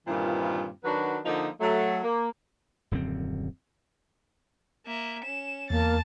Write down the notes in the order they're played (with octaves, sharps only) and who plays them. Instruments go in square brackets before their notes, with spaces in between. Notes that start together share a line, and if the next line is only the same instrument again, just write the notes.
[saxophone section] G2 A#2 D#3 E3 C4 F4
D#3 F#3 D4 F#4 B4
D3 F3 A#3 D#4
F#3 A3
A#3
[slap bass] D#1 F#2 D3 C4
[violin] A#3 E5
C#4 E7
[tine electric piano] E2 [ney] A#3 [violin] A5 A6